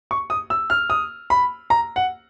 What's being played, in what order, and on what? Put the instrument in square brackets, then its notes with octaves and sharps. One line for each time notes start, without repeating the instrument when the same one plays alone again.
[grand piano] C#6
D#6
E6
F6
D#6
B5
A#5
F#5